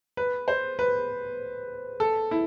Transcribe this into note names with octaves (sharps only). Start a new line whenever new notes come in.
B4
C5
B4
A4
E4